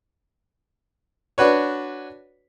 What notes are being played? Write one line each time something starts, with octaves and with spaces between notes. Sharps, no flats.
D4 F#4 B4 C#5